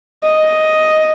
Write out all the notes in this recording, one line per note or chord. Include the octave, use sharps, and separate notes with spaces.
D#5